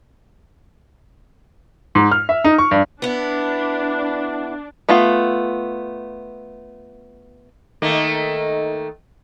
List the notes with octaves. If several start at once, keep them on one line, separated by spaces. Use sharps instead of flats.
G#2
F6
E5
D#4
C#6
G2
B3 D4 E4
A3 B3 F4
D#3 A3 A#3